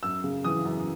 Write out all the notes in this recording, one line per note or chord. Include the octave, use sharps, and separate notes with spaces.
F#2 E6
C#3
E3 D#6
F#2